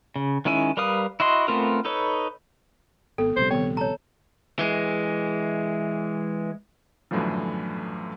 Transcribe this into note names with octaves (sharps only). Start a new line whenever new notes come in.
C#3
D#3 G#3 C#4 E4 G#5
G3 A#4 B4 F5 D#6
E4 F#4 D#5 C6
A3 B3 C4 F4 A#4
D#4 A4 B4 C#5
G#1 B3 A4
A#1 C3 G3 C5
D#3 B3 C#5
A4 C#5 A#5
E3 G#3
G1 F#2 A2 D3 E3 F3